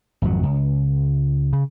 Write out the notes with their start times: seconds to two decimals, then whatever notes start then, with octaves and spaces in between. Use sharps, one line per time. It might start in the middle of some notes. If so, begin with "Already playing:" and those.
0.22 G#1 F2 F#3
0.43 C#2
1.53 C#3